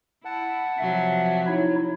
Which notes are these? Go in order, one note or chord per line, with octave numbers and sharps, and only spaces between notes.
E4 F#5 A5
C3 F3 F#3 E5
D#4 E4 C#5